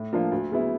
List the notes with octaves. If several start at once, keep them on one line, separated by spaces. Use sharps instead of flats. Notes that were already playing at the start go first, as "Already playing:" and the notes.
Already playing: A2
F3 A#3 D4 F4
D2
C#3 F#3 B3 E4